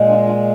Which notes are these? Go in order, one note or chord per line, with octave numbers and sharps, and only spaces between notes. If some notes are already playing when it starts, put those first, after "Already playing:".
Already playing: A#2 G#3
D4 F4
D4 F4